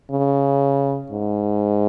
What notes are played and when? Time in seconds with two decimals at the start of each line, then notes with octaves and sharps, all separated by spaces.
0.11 C#3
1.11 G#2